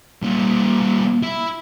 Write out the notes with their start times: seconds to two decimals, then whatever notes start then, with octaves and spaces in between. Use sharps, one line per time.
0.22 A#2 G3
1.23 E4